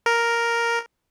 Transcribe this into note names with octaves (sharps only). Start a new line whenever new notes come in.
A#4